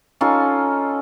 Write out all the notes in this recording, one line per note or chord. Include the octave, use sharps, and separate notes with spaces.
C#4 D#4 F4 A4